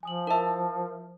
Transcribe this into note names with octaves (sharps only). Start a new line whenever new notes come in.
F3 G#5 D#6 F#7
E4 A#4 E5 A5 E6